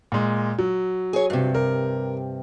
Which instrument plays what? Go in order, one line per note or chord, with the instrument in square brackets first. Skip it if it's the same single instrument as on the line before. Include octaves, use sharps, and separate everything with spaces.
[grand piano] A#2 G#3
F#3
[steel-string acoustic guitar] G#4 C#5
G2 C3
[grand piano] A#4